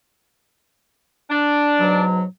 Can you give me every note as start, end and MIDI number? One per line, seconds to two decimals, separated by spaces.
1.30 2.02 62
1.80 2.23 44
1.80 2.23 47
1.80 2.23 54